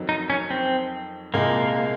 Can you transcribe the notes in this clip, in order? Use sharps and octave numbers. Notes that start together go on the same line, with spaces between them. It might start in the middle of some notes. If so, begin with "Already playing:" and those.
Already playing: F2 D#3 F#3
D#4
C#4
C4
C2 A#2 G#3 A#3